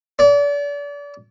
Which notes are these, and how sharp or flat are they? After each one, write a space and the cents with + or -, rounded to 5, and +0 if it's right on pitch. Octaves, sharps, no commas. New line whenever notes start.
D5 -35